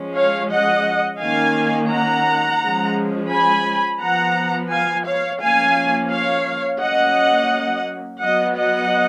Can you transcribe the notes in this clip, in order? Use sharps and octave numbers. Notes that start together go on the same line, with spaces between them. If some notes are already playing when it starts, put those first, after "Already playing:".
Already playing: F3 G#3 C#4
C#5 F5
D#5 F#5
D#3 A#3 C#4 F5 G#5
F#5 A#5
F3 G#3 C#4
G#5 B5
F3 B3 F#5 A#5
F5 G#5
C#5 F5
F3 A#3 C#4 F5 G#5
C#5 F5
F#3 A#3 C#4 D#5 F#5
F#3 B3 D#5 F#5
D#5 F#5